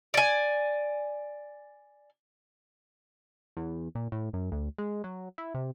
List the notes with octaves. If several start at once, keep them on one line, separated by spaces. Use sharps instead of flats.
D5 G#5
E2
A#2
A2
F#2
D2
G#3
F#3
E4
C3